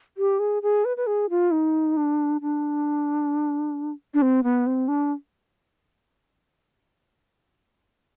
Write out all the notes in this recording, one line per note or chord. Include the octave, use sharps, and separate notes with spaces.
G4
G#4
G#4
B4
B4
G#4
F4
D#4
D4
D4
D4
C4
B3
C4
D4